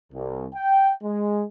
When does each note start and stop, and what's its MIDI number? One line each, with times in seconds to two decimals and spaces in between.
0.13 0.45 36
0.54 0.91 79
1.03 1.43 56